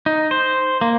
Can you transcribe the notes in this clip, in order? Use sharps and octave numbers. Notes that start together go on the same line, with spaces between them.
D#4
C5
A#3